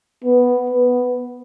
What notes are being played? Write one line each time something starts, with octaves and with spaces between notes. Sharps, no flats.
B3
B3